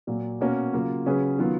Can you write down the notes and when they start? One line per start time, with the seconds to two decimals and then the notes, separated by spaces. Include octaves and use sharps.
0.07 A#2 F#3 A#3
0.41 B2 A#3 C#4 F#4 A#4
0.73 C#3 F#3 A#3 F4
1.06 C#3 F#3 C#4 G#4 B4
1.38 D#3 F#3 B3 F4